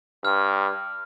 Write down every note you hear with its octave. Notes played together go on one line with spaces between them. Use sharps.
G2 F6